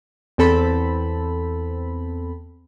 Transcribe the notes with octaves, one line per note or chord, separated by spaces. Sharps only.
E2 C4 A4 B5